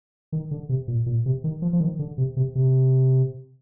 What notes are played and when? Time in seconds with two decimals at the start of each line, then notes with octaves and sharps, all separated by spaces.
0.32 D#3
0.51 D3
0.69 C3
0.88 A#2
1.06 A#2
1.26 C3
1.44 D#3
1.62 F3
1.73 F3
1.81 D#3
1.99 D3
2.18 C3
2.37 C3
2.55 C3